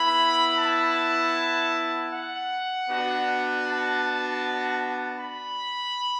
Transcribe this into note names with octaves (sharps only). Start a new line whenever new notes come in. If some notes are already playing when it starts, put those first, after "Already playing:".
Already playing: B3 E4 B5
A5
F#5
B3 D4 F#4
A5
B5